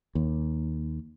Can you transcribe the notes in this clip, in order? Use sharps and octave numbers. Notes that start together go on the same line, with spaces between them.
D#2